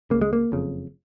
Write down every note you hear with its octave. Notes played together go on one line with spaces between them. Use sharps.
C#2 C#3 A#3
G#3
A#3
F#1 F2 C#3